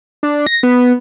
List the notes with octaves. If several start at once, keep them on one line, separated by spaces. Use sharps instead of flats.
D4
A#6
B3